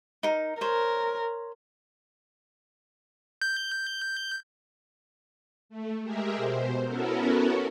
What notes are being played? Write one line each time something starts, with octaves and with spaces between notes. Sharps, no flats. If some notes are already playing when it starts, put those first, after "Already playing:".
D#4 A#4
A#4 C5 C#5
G6
A3
G#3 G4 G#4 A#4 E5
B2 C5
B3 C#4 E4 F#4 A4 A#4